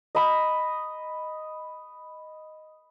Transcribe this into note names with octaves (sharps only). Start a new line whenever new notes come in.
D#5 B5 D#6